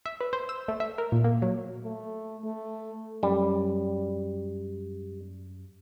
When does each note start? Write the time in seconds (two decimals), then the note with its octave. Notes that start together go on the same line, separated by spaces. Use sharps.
0.06 E5
0.21 B4
0.33 C5
0.49 E6
0.68 A3
0.80 E5
0.98 A#4
1.12 A#2
1.24 A#3
1.42 F#3
1.84 A3
2.45 A3
3.23 F#2 G3